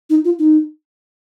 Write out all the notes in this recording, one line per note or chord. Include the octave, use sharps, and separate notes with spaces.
D#4
F4
D#4